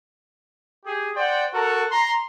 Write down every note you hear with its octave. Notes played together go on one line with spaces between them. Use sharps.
G4 G#4
C5 D5 F#5 G5
F#4 A4 A#4
A#5 C6